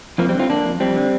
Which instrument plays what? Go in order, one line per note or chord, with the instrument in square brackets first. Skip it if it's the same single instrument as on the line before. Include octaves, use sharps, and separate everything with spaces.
[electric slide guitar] F2 F3 A#3
G3 C4
D3
C4 F4
D3 A#3 D4
F2
F2 G3 C4
D3